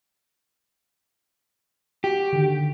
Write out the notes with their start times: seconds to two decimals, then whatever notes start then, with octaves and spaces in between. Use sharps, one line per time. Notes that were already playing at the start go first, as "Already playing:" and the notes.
2.04 F#4 G4
2.33 D3 D#3